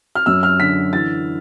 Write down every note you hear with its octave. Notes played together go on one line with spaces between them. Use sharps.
F6
F#2 E6
F6
D3 B6
E3 A6